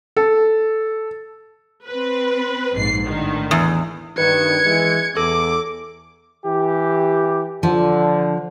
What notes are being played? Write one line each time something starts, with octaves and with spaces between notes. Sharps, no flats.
A4
C4 B4
A#1 G#2 C7
A2 D3 D#3
E2
G2 D#3 B4 G#6 C#7
E3 G#3
E2 A4 D6
E3 G4
D3 F3